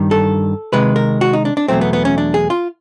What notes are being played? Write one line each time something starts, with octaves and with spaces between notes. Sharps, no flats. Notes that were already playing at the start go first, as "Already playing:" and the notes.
Already playing: G2 D#3 G3
A4
C3 D#3 G#3 B4
A#4
F#4
D#4
D4
D4
E2 B2 F#3 A3 C4
B3
B3
C#4
D4
G#4
F4